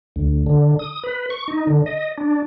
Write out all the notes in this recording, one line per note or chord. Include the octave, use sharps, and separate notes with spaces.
D2
D3
D#6
B4
C#6
D#4
D3
D#5
D4